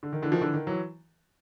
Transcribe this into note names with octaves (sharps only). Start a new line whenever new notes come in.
D3
D#3
D3 E3
D#3 F3
D3 E3
D#3
E3 F#3